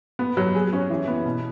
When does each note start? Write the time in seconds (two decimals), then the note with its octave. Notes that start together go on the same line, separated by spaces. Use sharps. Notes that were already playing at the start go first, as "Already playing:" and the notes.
0.19 B3
0.37 F#3
0.55 G#4
0.73 C#4
0.90 E3
1.08 B3
1.25 B2